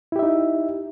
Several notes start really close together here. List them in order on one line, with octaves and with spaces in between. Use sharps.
E4 G4 E5 D#4